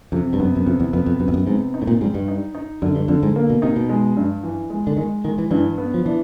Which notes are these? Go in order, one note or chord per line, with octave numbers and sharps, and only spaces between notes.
F2 C3
G2
F#2 B3
F#2
F2 C3
E2
F2 B3
F2
F#2 B3
F2
F#2
G#2 C3
D#4
A2
A#2
G#2 G3
G2
D#4
D#4
F#2 D3
G2
F2 D3
G#2
A#3
B2
C3 D#4
B2
G#3
G2
E3
G#3
D3
D#3 G#3
D#3 G#3
E3
G2 E3
B3
F3
E3 D4